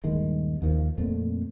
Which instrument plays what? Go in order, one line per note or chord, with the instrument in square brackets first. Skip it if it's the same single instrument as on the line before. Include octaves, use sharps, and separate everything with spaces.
[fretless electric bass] D#1 G2 D#3 G#3
D#2 D#3 F3
F2 A#2 A3 C4